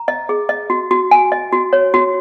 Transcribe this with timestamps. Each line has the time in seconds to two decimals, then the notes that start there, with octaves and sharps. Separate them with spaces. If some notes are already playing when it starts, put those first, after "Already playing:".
Already playing: A#5
0.08 D#5
0.29 G#4
0.49 D#5
0.70 F#4
0.91 F#4
1.11 G#5
1.32 D#5
1.52 F#4
1.73 C#5
1.94 F#4